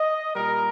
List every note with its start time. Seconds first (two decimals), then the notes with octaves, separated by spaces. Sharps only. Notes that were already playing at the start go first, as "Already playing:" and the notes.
Already playing: D#5
0.35 A#2 G3 A#4